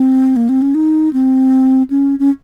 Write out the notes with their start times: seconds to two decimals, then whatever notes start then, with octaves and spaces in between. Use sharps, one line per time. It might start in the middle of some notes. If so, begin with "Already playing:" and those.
Already playing: C4
0.36 A#3
0.49 C4
0.62 C#4
0.75 D#4
1.13 C4
1.90 C#4
2.19 C#4